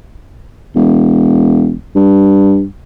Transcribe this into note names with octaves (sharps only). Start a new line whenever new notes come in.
E1
G2